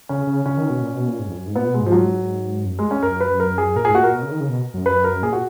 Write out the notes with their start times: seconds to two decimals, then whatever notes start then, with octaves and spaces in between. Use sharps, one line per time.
0.09 C#3 C#4
0.27 C#3
0.46 C#3 C#4
0.57 D#3
0.70 B2
0.82 A#2
0.94 B2
1.08 A#2
1.19 G#2
1.28 F2
1.37 F#2
1.47 G#2
1.56 A#2 B3
1.68 B2
1.74 G#3
1.81 G#2
1.86 F3
1.92 F#3
2.66 F#2
2.79 G#3
2.91 C#4
3.03 F#2 A#4
3.21 B4
3.40 A#4
3.58 G#4
3.76 A#2 A#4
3.85 G#4
3.89 G#2
3.95 A#2 F#4
4.03 A#4
4.13 B2
4.22 C#3
4.31 D#3
4.40 C#3
4.49 B2
4.74 F#2
4.86 B4
5.04 A#4
5.23 A#2 G#4
5.33 F#4